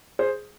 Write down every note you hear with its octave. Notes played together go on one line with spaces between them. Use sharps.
G#4 C5